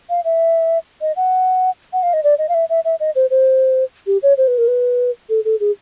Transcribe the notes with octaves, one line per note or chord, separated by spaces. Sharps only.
F5
E5
D#5
F#5
F#5
F5
D#5
D5
D#5
F5
E5
E5
E5
D#5
C5
C5
G4
C#5
C5
B4
A#4
B4
A4
A4
G#4